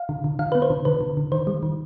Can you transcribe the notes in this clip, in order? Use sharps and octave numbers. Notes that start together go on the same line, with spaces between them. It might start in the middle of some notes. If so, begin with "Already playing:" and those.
Already playing: F5
D3
D3
D3 F5
B3 B4
C5
D3
D3 B4
D3
D3
D#3 C5
G3
D#3